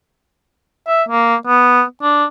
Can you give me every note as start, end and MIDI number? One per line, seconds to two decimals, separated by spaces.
0.88 1.03 76
1.09 1.36 58
1.47 1.83 59
2.03 2.25 62